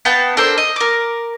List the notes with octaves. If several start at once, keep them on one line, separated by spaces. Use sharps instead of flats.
B3 F5 G5 A5
D4 A4 A#4 C5
D#5
A#4 D6